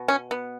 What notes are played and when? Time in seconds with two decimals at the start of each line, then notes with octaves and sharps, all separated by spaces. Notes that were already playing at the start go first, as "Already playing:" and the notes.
Already playing: B2
0.08 C#4
0.31 B3